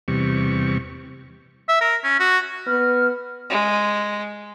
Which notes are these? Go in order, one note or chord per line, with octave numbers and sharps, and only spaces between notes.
E2 C3 G3 C#6
E5
A#4
C#4
F#4
B3 F6
G#3